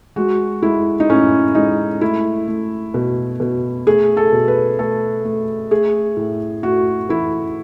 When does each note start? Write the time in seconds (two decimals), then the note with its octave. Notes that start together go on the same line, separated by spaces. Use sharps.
0.16 G#3 F#4
0.62 G#3 E4
1.00 D#4
1.10 A2 C#4
1.55 G#3 D#4
2.01 A3 E4
2.48 A3
2.94 B2
3.40 B2
3.87 A3 G#4
4.17 A4
4.32 B2
4.48 B4
4.78 A3 A4
5.25 A3
5.71 A3 G#4
6.17 A2
6.63 A3 F#4
7.09 E3 E4